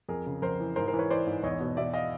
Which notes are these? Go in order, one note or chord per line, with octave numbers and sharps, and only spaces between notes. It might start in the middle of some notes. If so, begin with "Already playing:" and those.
F2 G#4 A#4
C#3
F2 A#4 C5
E3
G#2 A#4 C5
A#4 C5
E3
B4 C#5
E3 C5 D5
G#2
E2 C#5 D#5
B2
B2 D5 E5
D#5 F5